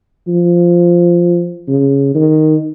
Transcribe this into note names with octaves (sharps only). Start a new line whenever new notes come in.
F3
C#3
D#3